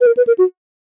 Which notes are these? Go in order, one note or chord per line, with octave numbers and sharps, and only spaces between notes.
B4
A#4
B4
A#4
F#4